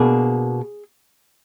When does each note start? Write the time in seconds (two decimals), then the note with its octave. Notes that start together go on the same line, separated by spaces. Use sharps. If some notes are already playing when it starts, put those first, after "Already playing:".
Already playing: B2 A#3 D4 G#4